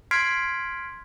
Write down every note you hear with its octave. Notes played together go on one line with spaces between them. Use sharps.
C6 F6 G#6 B6 C7 D7